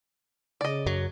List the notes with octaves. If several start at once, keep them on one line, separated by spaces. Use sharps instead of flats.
C#3 D5 D#5
F#2 F#3